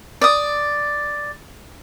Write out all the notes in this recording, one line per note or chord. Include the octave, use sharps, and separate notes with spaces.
D5 D#6